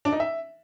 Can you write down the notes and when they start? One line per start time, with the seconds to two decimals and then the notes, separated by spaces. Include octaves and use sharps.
0.05 D4
0.12 D#4
0.20 E5